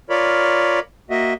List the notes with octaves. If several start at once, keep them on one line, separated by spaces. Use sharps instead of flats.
F4 A#4 C#5 D5 B5
A#3 F#4 D#5 E5